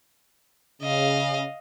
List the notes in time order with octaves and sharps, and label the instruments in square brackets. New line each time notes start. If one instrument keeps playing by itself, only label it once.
[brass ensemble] C#3 [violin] D#5 F5